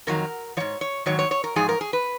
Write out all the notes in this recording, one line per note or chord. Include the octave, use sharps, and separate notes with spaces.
F2 D#3 F#3 A#4
G#2 F3 C#5
C#5
G#2 D#3 F#3 C#5
C#5
C#5
A#4
G#2 F3 G#4
A#4
G#4
B4